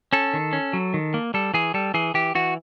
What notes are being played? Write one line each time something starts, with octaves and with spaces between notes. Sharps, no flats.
C#4 A4
D#3
C#4
F#3
D#3
A#3
G3 A4
E3 G#4
G3 A4
E3 G#4
E3 G4
E3 F#4